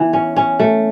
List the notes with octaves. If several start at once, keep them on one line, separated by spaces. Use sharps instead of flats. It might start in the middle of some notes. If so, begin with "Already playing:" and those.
Already playing: E3 B3
C#4
C#4
A3